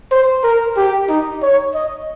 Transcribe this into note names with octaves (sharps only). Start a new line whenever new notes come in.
C5
A#4
G4
D#4
C#5
D#5